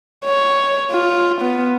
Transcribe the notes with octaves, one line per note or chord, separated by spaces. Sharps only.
C#5
F4
B3